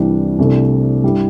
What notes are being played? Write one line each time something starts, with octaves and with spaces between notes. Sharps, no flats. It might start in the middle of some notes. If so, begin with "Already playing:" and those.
Already playing: C2 C3 E3 G3 D4
C2 C3 A3 D4
G2 G3 E4 G4